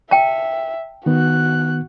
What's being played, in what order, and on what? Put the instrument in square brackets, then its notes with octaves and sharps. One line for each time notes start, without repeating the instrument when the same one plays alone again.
[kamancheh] E5 [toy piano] G5 A5
[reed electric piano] D#3 B3 [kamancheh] F#4 F#6